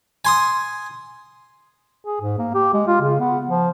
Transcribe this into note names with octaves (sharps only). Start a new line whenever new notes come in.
G#5 C6 D#6
G#4
G#2
A#3
G4
G#3
F4
C#3
B3
F3